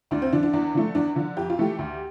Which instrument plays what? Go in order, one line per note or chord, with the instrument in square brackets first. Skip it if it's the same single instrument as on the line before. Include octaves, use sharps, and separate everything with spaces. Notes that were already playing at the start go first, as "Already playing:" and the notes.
[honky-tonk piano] D2 D4
C4
D3 F3 D4
D4
E2 D4
D3 F3 A3
E2 D4
D3 F3
F2 G4
F4
E3 A3 G4
D2